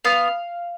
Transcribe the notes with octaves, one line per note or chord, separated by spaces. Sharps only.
B3 F5